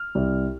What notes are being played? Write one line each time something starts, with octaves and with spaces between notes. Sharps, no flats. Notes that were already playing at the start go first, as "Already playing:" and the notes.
Already playing: F6
C2